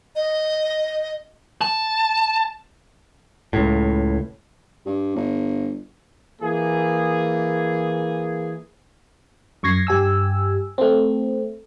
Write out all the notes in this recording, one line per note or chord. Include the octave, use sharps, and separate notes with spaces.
D#5
A5
C#2 A2
G2
G1
E3 A#3 G#4
F#2 C#6 G#6 A#6 C7
G2 G4 G#5 E6
A3 C4